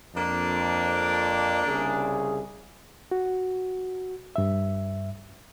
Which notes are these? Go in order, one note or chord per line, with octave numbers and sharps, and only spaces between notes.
F2 A#3 D4
C2 C#3 G#4
F#4
G2 E5